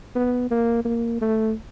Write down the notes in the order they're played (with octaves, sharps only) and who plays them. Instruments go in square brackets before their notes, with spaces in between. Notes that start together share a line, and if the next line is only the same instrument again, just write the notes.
[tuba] B3
A#3
A#3
A3